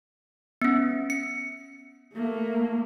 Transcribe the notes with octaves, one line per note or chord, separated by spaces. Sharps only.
B3 C#4
C#7
A3 A#3